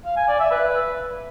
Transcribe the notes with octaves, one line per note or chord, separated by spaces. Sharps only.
F5
G#5
D5
E5
B4